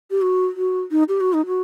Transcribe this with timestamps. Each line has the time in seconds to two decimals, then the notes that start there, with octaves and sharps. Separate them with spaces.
0.11 G4
0.22 F#4
0.56 F#4
0.91 D#4
1.09 G4
1.21 F#4
1.33 D#4
1.46 F#4